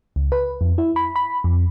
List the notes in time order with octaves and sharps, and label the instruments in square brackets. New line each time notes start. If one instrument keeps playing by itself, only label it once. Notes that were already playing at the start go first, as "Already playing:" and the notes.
[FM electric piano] C#2
B4
F2
E4
B5
B5
F2